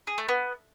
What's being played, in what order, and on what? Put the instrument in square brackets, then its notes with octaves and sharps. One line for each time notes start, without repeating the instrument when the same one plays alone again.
[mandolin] G#4
A3
B3